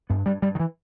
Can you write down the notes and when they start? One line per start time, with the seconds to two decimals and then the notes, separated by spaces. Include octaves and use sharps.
0.10 G2 B3
0.26 G2 G3
0.42 G2 G3
0.55 D#3
0.60 E3